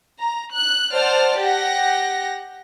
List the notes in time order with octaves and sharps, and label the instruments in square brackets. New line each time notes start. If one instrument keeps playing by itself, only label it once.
[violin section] A#5
F#6
C5 D5 F#5 A5 F6
G4 F#5 A#6